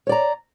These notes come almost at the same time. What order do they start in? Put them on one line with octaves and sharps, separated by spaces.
C#5 D5 A#5